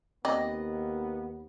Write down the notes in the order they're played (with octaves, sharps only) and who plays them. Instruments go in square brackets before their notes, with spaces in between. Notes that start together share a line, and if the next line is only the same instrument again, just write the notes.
[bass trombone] D#2 [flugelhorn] B3 [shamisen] C4 D5 [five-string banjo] D#5